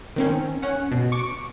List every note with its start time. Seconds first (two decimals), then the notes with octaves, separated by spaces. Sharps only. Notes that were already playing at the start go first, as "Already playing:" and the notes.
0.16 D#3 C4 C#4
0.62 C#4 F#5
0.92 B2
1.12 C#6 D6